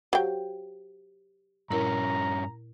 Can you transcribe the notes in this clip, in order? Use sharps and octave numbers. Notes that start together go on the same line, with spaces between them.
F#3 G4 C5 F5 G5
G2 A#2 C#4 E4 A#4 A#5